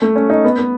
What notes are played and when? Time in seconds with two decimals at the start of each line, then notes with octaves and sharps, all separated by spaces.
0.02 A3
0.16 C#4
0.30 D#4
0.45 B3
0.58 B3